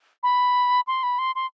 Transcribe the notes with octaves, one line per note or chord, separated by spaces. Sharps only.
B5
C6
B5
C6
C6